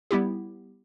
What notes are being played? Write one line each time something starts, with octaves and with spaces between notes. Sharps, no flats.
G3 B3 E4 G4